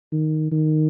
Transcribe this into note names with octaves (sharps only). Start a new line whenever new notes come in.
D#3
D#3